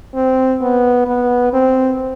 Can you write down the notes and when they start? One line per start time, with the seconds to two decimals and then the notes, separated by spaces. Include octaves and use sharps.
0.15 C4
0.61 B3
1.08 B3
1.53 C4